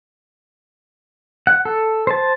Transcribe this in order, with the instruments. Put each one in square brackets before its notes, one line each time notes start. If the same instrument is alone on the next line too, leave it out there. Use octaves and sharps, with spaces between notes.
[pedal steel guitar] F#5
A4
C5 A5